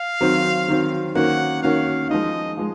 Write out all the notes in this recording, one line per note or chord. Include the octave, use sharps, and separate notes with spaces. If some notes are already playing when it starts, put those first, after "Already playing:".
Already playing: F5
D#3 F#3 C4
D#3 F#3 C4
D#3 A#3 C#4 F#4 F#5
D#3 A#3 C#4 F#4 F5
F3 G#3 D#4 D#5
F3 G#3